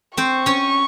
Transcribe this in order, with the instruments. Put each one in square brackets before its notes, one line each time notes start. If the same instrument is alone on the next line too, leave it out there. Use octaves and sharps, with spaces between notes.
[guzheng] C4 C5 [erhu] C#6
[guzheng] C#4 C#5